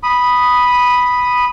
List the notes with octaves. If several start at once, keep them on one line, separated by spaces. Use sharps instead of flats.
B5 D#6